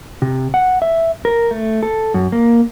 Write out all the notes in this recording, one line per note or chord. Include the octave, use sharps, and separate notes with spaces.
C3
F#5
E5
A#4
A3
A4
F#2
A#3